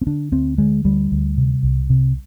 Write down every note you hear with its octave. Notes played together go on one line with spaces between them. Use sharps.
C4
D3 D4
D2 C4
D3 G#3
D2 G3
D2
C3
C2
C3